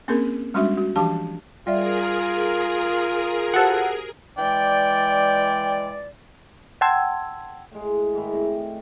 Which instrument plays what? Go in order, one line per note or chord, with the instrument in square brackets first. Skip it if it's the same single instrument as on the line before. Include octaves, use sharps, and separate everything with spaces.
[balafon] A#3 C4 C#4 G#4 A#4
G3 G#3 C#4 D4 F#4 E5
F#4
E3 F3 D4 G4 F5 A5
[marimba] G3 D5 E5 [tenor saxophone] F4 [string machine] G#4 A#4
[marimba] F#4 G4 C5 [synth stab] A4 F#5
[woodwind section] E3 G#3 D5 [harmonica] G5
[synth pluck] F#5 G5 A5 C6 E6 G#6
[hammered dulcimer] A2 G#3
G#2 D#3 E4
A2 C4 D#5 D6